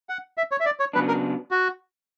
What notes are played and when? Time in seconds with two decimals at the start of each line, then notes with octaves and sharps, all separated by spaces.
0.09 F#5
0.37 E5
0.51 C#5
0.60 E5
0.65 D5
0.80 C#5
0.93 C#3 F#3 B3 D4 B4
1.08 A#4
1.51 F#4